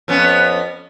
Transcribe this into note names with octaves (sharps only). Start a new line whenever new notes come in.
F2 B3 C#4